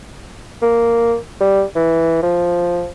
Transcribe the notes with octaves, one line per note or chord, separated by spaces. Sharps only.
A#3
G3
E3
F3